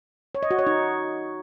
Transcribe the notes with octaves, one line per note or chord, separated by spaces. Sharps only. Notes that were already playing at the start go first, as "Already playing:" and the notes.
C#5
D#5
F#4
C#5
D#4